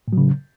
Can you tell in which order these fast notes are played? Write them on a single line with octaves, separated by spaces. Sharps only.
A2 F#3 C#3